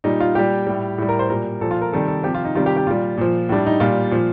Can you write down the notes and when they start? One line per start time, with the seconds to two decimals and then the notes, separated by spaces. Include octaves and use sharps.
0.04 A#2 G3 D#4
0.20 F4
0.35 A#2 G3 G4
0.67 A2 G3
0.98 A2 G3
1.09 A#4
1.19 C5
1.29 A#2 G3 A#4
1.61 A#2 F3 A4
1.71 F4
1.82 A#4
1.92 C3 D#3 G3 A4
2.08 A4
2.23 F3 G4
2.26 C3
2.34 F4
2.45 D#4
2.55 C3 D#3 G3 F4
2.66 G4
2.77 G4
2.86 A#2 G3 F4
3.17 A#2 F3
3.49 A2 G3 D4
3.66 D#4
3.80 A#2 G3 F4
4.11 A#2 F3